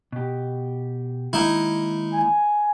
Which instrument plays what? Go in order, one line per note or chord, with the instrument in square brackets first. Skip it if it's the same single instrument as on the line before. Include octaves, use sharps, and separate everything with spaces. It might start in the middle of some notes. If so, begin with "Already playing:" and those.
[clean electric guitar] B2 G4
[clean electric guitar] D#3 G#3 A#3 [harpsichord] D#4 E4
[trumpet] G#5